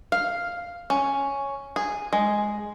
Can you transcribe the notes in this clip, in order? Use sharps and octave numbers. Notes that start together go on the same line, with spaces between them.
F5
C#4
G#4
G#3